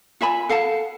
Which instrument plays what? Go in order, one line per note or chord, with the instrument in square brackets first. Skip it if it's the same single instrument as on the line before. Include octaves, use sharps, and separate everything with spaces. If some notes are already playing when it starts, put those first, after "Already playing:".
[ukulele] F4 E5 G#5 B5
A4 F5 F#5 A5